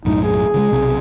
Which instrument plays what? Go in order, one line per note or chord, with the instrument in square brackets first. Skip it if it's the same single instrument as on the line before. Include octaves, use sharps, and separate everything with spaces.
[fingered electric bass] B1 F#2 A2 [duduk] D#4
[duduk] G#4
[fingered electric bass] C#3 F#3 G#3
B1 C3